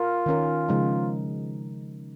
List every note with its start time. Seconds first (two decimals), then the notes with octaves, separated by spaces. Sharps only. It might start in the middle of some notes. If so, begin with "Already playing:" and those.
Already playing: F4 A#4
0.26 D#3 C#4 A#4
0.69 C#3 F3 G#3 D#4